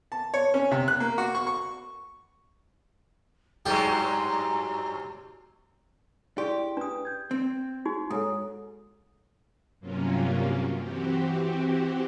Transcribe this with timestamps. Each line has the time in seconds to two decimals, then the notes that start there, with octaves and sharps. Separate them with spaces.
0.12 A5
0.34 C#5
0.54 C#4
0.71 C3
0.88 F#6
1.00 A#3
1.18 F#4
1.35 C#6
1.47 C#6
3.66 G2 F#3 G#3 G4 A#5
6.38 E4 G4 G#4 D5 C6
6.77 D4 B4 D#6
7.05 G6 G#6
7.31 C4
7.86 D#4 F#4 G#4
8.10 G#2 A4 C#5 D#6
9.80 G2 C3 F#3 A#3 C#4 F4
10.77 E3 C4 F#4 G4